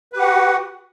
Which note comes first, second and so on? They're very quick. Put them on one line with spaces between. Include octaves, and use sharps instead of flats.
B4 G4 F#5 F#4